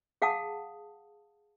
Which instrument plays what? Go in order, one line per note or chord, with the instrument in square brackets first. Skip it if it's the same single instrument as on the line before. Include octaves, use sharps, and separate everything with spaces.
[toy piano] G#4 F5 F#5 A5 D#6